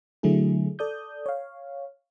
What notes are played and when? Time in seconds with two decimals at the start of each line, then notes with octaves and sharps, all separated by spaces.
0.23 D3 F#3 A3 E4 G#4
0.79 A4 D5 D#6 G6
1.26 C#5 F5